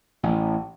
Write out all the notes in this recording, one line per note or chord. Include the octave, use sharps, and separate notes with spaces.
A1